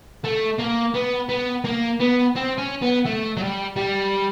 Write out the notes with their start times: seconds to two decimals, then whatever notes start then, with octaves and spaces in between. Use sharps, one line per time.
0.24 A3
0.59 A#3
0.94 B3
1.29 B3
1.64 A#3
2.00 B3
2.36 C4
2.58 C#4
2.82 B3
3.06 A3
3.37 F#3
3.41 G3
3.76 G3